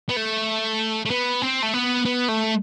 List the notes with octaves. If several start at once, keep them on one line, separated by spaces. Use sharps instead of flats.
B3
A3
A3
B3
C4
A3
B3
B3
A3